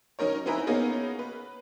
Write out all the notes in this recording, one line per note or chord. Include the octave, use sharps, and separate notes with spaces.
F#3 C#4 D#4 A#4 C#5
C4 D#4 E4 B4 G#5 A#5
A#3 B3 C#4 D#4 G#4 A#4
B4